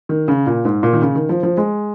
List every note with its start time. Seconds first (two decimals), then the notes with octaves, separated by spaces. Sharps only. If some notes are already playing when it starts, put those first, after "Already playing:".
0.09 D#3
0.28 C#3
0.47 A#2
0.65 G#2
0.83 A#2
0.93 D#3
1.02 C#3
1.15 D#3
1.29 F3
1.43 F3
1.57 G#3